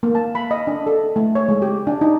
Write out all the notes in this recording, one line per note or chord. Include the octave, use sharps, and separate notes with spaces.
A#3
A5
B5
D#5
D4
A4
A3
C#5
G#3
G4
D4
D#4